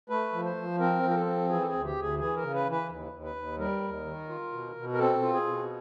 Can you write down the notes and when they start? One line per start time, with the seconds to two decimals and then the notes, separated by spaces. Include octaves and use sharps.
0.09 A3 B4
0.33 F3
0.45 C5
0.56 F3
0.79 C4 A#4
1.03 F3
1.10 A#4
1.14 A4
1.26 C4
1.49 E3 G#4
1.62 A4
1.67 G#4
1.73 D2
1.85 G4
1.96 D2
2.02 G#4
2.19 E3 G#4
2.37 A#4
2.43 C#3
2.54 B4
2.66 E3
2.71 B4
2.89 D#2
3.12 D#2
3.24 B4
3.36 D#2
3.59 G3 A#4
3.82 D#2
4.06 D#3
4.29 F4
4.52 B2
4.76 B2
4.93 A#4
4.99 C4 A4
5.22 F4
5.34 G#4
5.46 B2